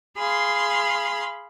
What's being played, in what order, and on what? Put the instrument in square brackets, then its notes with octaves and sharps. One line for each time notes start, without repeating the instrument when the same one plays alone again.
[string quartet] G#4 F5 B5 C6